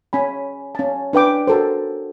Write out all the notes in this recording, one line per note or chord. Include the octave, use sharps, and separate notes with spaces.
C#4 G#5 B5
C#4 A5
D4 B4 G5 D6
F#4 A4 A#4 C5